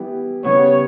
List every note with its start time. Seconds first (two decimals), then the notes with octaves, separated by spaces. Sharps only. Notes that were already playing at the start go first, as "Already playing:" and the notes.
Already playing: E3 G3 B3 E4 G4
0.44 C#3 G3 B3 C#5